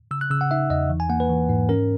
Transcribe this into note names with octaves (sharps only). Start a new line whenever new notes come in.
C#3 E6
F#6
C#3 E6
F#5
D#4 E5
E2 D#5
E3
G#5
A#3 F#5
B4
E3
G#2
C#4 A#4